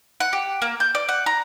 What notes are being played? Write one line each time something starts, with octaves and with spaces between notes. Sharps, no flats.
F#5
G4
A#3
G6
D5
F#5
A#5